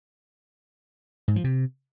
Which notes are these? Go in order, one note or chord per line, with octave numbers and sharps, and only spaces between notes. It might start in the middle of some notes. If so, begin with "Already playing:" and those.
G#2
F3
C3